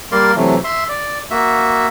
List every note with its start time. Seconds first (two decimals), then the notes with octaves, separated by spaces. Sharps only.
0.12 G3 A#3 A#4 D5 C6
0.36 C3 E3 F#3 A3
0.64 E5 C6
0.89 D5
1.31 A#3 F#4 E5